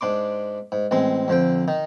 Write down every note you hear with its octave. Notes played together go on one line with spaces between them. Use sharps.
G#2 D4 C6 D6
G#2
A1 G#3 C4 C6
F2 D3 C5 G5
D#3 D#4